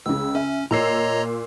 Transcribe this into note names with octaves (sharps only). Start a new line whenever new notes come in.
C#2 C#3 E6
C#4 E5
A#2 C#5 D#5 A#5 E6 C7